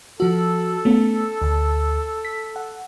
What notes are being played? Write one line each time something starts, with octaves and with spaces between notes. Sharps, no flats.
F3 F#4 A4
A3 B3 C#4
D2 A5
B6
F#5